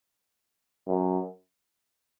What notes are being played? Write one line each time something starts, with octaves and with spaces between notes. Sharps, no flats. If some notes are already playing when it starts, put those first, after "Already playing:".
F#2